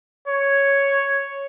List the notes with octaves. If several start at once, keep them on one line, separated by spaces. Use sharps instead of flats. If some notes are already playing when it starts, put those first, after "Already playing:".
C#5